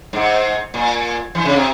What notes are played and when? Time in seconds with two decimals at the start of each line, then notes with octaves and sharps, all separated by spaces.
0.13 G#2
0.74 A#2
1.35 E3
1.45 C#3
1.56 C3